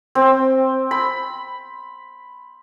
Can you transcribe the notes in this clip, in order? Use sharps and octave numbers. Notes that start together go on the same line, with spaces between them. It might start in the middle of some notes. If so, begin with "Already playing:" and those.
C4
B5